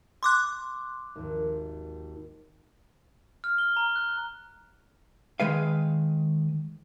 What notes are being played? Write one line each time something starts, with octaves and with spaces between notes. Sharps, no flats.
C6 D6 F#6
G#1 D#2
F6
G7
A#5
F#6
D#3 G#3 B4 F5